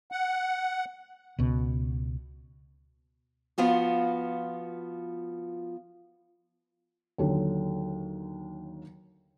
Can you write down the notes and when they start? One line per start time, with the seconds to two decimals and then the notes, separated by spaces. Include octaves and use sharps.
0.12 F#5
1.39 C#2 B2
3.58 F3 B3 F4 F#4
7.18 D#2 D3 F#3